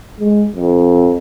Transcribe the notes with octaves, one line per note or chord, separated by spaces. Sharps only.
G#3
F2